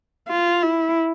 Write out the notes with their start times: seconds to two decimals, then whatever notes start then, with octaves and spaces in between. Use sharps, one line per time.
0.28 F4
0.63 E4